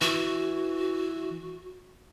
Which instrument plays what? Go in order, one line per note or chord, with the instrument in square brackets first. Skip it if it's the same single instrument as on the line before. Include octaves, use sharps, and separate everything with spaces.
[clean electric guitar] E3 [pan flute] F#4